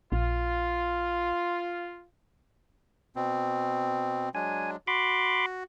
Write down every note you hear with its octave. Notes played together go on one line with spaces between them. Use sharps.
A#1 F4
B2 C4
F#3 G#3 D4 G#5
F#4 B5 C6 D6